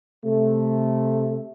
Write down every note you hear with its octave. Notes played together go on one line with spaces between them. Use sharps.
C3 A3